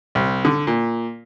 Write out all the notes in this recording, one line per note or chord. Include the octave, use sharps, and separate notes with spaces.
C2
D3
A#2